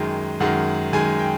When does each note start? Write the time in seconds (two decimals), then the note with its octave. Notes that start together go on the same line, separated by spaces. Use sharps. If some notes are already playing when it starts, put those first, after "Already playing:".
Already playing: F#2 D#3 G#3 G5
0.40 F#2 D#3 G#3 F#5
0.93 F#2 D#3 G#3 G#5
1.19 G5